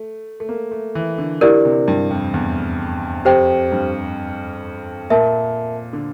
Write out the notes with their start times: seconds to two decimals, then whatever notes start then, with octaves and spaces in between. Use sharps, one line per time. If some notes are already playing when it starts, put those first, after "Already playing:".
Already playing: A3
0.40 A3
0.49 A#3
0.71 A3
0.95 E3
1.18 D3
1.41 D3 E4 G4 A#4 D5
1.65 C3
1.88 G2
2.10 F2
2.34 E2
3.25 F2 G4 C5 G5
3.72 G2
5.10 A#2 A#4 E5 A5
5.93 D3